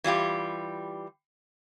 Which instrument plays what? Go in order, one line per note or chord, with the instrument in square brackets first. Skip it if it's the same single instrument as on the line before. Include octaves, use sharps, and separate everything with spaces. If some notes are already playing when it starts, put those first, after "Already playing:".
[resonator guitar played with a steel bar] E3 G3 F4 G4